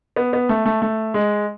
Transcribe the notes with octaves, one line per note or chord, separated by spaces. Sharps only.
B3
B3
A3
A3
A3
G#3